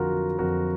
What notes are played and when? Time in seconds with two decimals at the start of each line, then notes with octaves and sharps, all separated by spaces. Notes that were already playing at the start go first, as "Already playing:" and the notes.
Already playing: F2 D3 F4 F#4 A#4
0.09 F#3
0.38 F2 F#4 A#4